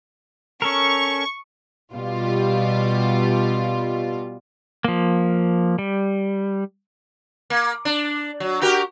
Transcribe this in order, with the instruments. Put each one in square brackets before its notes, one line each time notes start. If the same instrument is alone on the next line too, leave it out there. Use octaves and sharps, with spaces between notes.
[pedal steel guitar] C#4 A4 A#4 [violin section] C#6
[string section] B2 G3 F4
[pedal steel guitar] F3 A#3
G3
[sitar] A#3
D4
F#3
F#4 G4 A#4